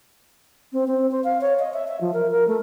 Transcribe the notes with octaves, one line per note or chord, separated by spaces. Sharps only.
C4
C4
C5
F5
C#5
D#5
E5
E5
F3
A#4
A#4
A3